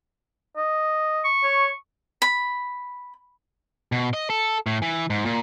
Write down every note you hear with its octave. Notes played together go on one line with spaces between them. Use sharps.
D#5
C#6
C#5
B5
B2
D#5
A4
A2
E3
G#2
A#2